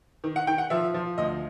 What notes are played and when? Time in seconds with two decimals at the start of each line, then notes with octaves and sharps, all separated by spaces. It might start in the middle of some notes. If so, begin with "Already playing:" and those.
0.24 D#3
0.36 F#5
0.47 D#3 G5
0.58 F#5
0.70 F3 E5
0.94 F3
1.18 D2 D#5